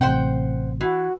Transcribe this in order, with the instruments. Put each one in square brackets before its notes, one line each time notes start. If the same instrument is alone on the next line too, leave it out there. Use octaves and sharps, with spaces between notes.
[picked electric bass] A1 C3 [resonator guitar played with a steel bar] C5 F#5 G5
[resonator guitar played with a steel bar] E3 [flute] F#4